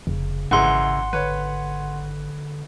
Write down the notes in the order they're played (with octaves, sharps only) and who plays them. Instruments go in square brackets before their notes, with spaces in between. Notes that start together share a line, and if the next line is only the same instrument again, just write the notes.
[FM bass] F1 [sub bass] C#3
[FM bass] G#1 [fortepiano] F#2 E3 G#3 [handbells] F#5 C6
[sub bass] D3 [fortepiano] B4 C#5